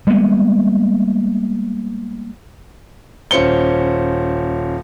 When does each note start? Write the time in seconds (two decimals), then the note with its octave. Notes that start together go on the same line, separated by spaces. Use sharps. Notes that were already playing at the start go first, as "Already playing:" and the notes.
0.07 G3 G#3 A#3 B3
3.31 D#1 C#4 C5 C#7 G7